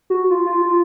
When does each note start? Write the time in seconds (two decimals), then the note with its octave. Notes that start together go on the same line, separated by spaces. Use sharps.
0.10 F#4
0.31 F4
0.46 F4
0.62 F4